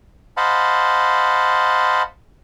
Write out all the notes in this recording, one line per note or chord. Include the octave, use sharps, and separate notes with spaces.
C5 D#5 F5 F#5 A5 B5